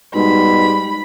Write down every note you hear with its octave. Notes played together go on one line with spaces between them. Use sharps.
G#2 B2 G3 B5